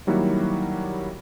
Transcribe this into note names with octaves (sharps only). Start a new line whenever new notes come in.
D#3 F#3 G3 A#3 E4 F#4